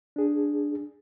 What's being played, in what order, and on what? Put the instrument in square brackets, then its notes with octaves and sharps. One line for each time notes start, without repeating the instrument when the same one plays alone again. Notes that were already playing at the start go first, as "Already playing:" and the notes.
[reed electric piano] D4 G#4